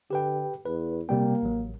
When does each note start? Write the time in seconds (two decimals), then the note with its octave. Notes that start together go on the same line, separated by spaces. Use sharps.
0.11 D3 G4 B4 G5
0.66 E2 B4
1.09 C3 G3 A#3 G5
1.43 A1 F#3